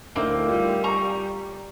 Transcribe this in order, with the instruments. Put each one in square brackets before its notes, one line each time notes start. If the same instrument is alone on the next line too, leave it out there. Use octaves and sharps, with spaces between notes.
[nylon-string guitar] D2 A2 D4 [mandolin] A#3 C4 D#4
[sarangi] G3 [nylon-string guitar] F4
[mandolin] A#5 C#6